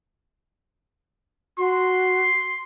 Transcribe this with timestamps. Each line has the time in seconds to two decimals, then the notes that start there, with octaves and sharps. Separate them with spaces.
1.58 F#4 C6